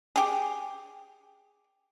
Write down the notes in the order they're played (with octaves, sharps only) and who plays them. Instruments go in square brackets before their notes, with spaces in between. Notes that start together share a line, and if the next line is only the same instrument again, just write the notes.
[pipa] G4 G#4